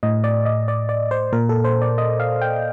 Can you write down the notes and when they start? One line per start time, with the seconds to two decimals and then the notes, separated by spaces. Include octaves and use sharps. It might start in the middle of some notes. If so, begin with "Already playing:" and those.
0.03 A2 D#5
0.24 D5
0.45 D#5
0.68 D5
0.89 D5
1.11 C5
1.32 A#2 A#4
1.49 A4
1.65 C5
1.82 D5
1.98 D#5
2.20 F5
2.42 G5